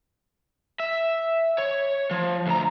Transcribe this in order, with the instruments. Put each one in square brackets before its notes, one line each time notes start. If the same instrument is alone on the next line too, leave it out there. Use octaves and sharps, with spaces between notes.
[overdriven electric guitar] E5
C#5
F3
D2 A#5